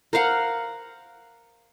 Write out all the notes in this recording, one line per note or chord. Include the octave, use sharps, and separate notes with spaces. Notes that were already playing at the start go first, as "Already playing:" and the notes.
A#4 C5 F5 F#5